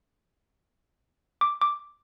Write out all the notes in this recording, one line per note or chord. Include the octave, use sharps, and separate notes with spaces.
D6
D6